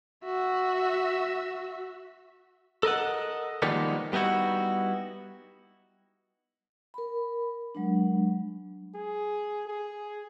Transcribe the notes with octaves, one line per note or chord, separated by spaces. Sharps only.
F#4 E5
A4 A#4 D#5 F#5
D#3 F3 G3 G#3 A#3 B3
G3 B3 D#4 E4 F#4
A#4 B5
F#3 G#3 D4
G#4
G#4